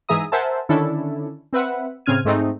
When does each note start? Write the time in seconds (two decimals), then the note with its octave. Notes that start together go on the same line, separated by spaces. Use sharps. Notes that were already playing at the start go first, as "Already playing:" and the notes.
0.09 G#2 E3 G#4 E5 A#5 D#6
0.32 A#4 C5 E5 F#5 G#5 A5
0.69 D3 D#3 C#4 D4 E4 A4
1.53 C4 B4 E5 F#5
2.06 A2 C#3 C4 F6 G#6 D#7
2.24 G#2 G#3 A3 C4 D#4